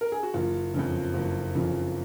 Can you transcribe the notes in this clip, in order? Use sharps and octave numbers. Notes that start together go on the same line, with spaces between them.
A#4
G#4
F#4
F#1 F4
F2 C#3 F3
F#1
F2 C#3 F3